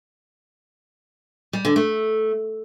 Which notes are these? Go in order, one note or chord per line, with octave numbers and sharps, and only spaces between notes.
G3
D3
A3